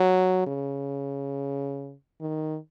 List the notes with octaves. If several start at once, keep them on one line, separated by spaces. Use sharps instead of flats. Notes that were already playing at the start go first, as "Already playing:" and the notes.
Already playing: F#3
C#3
D#3